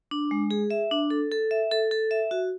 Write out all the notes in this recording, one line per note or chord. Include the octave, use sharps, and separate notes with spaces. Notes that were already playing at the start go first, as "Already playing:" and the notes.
D4
G#3
G#4
E5
D4
A4
A4
E5
A4
A4
E5
F#4